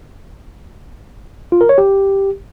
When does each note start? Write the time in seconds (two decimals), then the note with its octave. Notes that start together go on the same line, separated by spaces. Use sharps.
1.52 F4
1.61 A#4
1.69 C#5
1.78 G4